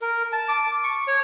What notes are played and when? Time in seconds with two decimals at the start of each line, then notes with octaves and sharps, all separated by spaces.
0.01 A#4
0.32 A5
0.48 D6
0.84 C#6
1.07 C#5